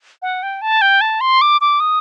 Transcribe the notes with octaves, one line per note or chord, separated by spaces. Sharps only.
F#5
G5
A5
G5
A5
C6
D6
D6
D#6